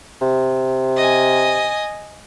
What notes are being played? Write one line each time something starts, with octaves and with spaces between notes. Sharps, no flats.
C3
D#5 G#5